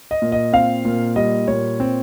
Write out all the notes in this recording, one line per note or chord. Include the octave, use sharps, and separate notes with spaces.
D#5
A#2
D#5
C4 F5
A#2
G3 D#5
A#2 C#5
C4